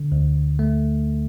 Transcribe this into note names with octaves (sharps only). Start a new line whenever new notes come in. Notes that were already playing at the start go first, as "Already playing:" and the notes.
Already playing: D3
D2
A3